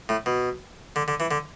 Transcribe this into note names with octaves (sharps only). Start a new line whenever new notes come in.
A2
B2
D3
D3
E3
D3